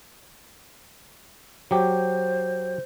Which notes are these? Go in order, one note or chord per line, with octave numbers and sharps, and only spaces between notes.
F#3 G4 C5